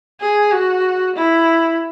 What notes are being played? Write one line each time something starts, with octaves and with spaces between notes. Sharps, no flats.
G#4
F#4
E4